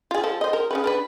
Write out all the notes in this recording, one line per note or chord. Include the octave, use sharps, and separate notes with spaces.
F4 G#4
F3 A4
C5 D#5
A#4
C#3 C#4 B4
D4 A#4 B4